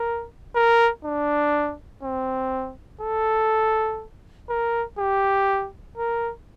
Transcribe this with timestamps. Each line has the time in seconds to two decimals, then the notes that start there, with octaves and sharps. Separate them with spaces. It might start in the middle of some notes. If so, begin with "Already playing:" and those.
Already playing: A#4
0.55 A#4
1.05 D4
2.03 C4
3.02 A4
4.49 A#4
4.99 G4
5.98 A#4